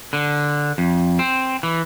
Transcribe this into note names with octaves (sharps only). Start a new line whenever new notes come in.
D3
F2
C4
E3